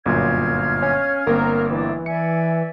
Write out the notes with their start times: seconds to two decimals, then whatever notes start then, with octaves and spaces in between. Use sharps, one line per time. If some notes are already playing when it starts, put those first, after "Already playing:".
0.06 G1 F#2 A#2 F5 F6 G#6
0.82 C#4
1.27 G1 A#3 C4 A#4
1.71 E3 D4 D6
2.06 D5 E5 G#5 C#7